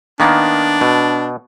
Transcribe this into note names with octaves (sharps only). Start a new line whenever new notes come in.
D#3 A#3 B3 D4
B2